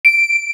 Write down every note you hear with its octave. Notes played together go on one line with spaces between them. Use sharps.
D7